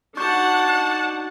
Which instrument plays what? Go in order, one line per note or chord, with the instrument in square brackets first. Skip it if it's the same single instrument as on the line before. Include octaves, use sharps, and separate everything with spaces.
[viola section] D4 F#5 [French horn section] D#4 F#4 [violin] A5 [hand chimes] C#6 G6